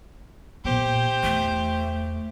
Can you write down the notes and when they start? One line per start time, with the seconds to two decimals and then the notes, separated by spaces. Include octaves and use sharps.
0.65 A#2 B3 G4 C5
1.23 E2 A3